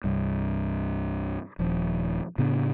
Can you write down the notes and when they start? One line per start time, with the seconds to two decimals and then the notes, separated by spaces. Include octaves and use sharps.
0.04 C2 G2
1.59 D#1 F3
2.38 A2 C#3 B3 D4